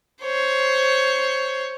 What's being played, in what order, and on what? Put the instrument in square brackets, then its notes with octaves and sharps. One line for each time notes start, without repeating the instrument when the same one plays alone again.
[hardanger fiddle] C5 C#5